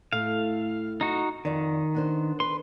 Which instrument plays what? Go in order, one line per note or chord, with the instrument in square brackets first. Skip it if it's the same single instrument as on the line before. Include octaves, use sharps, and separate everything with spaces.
[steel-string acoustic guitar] A2 A3 [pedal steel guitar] F5
[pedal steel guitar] D#4 F#4
[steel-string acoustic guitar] F2 D5 [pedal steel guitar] D#3
[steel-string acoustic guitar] B3 D4 C5
[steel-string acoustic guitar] B4 [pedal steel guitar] C6